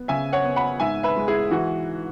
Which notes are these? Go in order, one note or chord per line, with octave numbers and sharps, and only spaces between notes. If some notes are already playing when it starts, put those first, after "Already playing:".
Already playing: B3
C#3 E5 G#5
C#5 F#5
B3
F#5 B5
G#2 E5 G#5
B4 E5
G#3
E4 G#4
E3 F#4